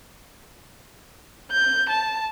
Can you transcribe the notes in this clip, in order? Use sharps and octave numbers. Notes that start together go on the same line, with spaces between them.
G6
A5